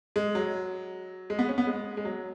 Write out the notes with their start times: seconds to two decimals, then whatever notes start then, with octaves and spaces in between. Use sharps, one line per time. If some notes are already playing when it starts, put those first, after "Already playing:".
0.16 G#3
0.35 F#3
1.30 G#3
1.39 B3
1.49 C#4
1.58 B3
1.67 G#3
1.97 G#3
2.05 F#3